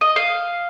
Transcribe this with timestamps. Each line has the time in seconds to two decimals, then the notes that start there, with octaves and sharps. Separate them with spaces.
0.01 D#5
0.16 F5